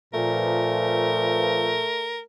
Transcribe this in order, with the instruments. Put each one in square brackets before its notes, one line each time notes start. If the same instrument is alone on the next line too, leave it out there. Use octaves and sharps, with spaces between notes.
[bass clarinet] A#2 [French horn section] F3 B4 [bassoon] A3 [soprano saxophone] A#4